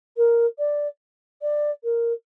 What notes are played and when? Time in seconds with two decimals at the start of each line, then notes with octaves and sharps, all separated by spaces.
0.17 A#4
0.59 D5
1.42 D5
1.84 A#4